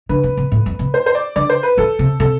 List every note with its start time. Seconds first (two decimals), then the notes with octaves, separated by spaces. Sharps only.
0.09 D3 B4
0.24 C3
0.37 C3
0.52 A2
0.66 F2
0.79 C3
0.94 C5
1.06 C5
1.15 D5
1.36 D3 D5
1.50 C5
1.63 B4
1.77 E3 A4
1.99 C3
2.20 C3 A4